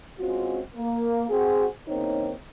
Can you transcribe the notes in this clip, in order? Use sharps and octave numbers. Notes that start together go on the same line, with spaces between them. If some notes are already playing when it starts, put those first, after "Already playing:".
G#3 C4 C#4 F4 F#4
A#3
C4 F#4 G#4
E2 C#3 A#3 C4 D#4 C#5